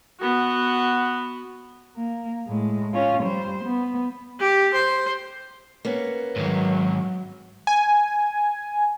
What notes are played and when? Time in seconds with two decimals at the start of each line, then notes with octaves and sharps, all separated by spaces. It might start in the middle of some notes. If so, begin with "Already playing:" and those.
0.20 B3 F#4
1.97 A#3
2.48 A2 G#3
2.94 C#4 F4
3.24 G3 C5
3.64 B3
4.40 G4
4.73 C5
5.85 A#3 B3 C#4
6.36 G#2 D#3 F#3
7.67 G#5